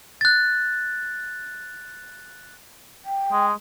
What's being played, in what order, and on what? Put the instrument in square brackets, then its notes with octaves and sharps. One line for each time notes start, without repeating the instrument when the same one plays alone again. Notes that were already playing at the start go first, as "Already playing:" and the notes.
[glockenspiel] F#6 A6
[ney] G5
[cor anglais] G#3